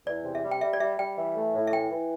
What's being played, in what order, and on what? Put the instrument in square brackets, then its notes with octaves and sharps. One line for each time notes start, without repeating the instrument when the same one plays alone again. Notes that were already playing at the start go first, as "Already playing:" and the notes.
[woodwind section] E2 [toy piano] D5
[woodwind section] C3
[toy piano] E5
[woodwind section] G3
[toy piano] G5
[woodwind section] G3 [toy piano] E5
[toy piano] D5
[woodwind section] G3 [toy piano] E5
[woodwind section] G3 [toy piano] G5
[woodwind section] E3
A3
A2
[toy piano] E5
[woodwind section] E3 [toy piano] G5
[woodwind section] E3